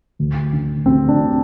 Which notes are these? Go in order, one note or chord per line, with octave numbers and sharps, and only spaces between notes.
D2
D3
D2 C4
D4
D3